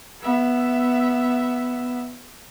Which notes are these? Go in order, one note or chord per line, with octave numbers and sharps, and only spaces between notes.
B3 E5